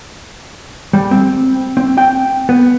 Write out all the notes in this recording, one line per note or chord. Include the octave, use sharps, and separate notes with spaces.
G3
C4
C4
G5
B3